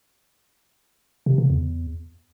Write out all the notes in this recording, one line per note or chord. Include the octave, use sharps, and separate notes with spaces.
C3
C#3
E2